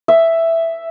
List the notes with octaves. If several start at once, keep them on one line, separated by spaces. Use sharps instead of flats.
E5